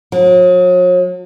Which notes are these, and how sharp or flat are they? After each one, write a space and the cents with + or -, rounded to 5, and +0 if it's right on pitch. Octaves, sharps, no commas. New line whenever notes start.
F#3 -45